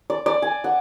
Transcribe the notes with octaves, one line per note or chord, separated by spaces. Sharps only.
D5
D5
G#5
F#5